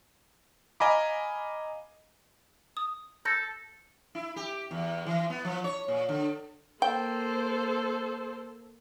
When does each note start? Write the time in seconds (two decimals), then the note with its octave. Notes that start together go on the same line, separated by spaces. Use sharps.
0.80 D#5 F5 G#5 A#5 B5 D6
2.77 D#6
3.25 A4 G6 A#6 C#7
4.15 E4
4.36 G4
4.71 E2
5.06 E3
5.30 B3
5.45 F3
5.64 C#5
5.88 A#2
6.09 D3
6.82 A#3 A4 C5 G5